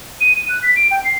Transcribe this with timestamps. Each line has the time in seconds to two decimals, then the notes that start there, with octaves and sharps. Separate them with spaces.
0.21 D#7
0.36 D#7
0.49 F#6
0.63 B6
0.76 D7
0.91 G5
1.04 C7